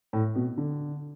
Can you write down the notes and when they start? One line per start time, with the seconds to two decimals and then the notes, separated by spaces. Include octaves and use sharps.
0.13 A2
0.35 B2
0.57 D3